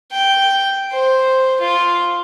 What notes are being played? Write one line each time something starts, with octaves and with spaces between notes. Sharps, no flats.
G5
C5
F4